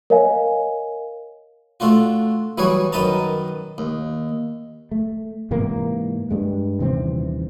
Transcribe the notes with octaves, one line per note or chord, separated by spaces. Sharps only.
A#4 C#5 D#5 F5 G#5
A3 D4 F4 F#4
E3 F#3 G3 F#4 G#4 C#5
F#2 D#3 B4 D#5 A5 A#5
D#2
A3
G#2 C3 E3 A#3
G2 G#3
D#1 C3 E3 C4